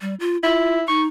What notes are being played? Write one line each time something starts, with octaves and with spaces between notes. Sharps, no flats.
G3
F4
E4 F4
D#4 C#6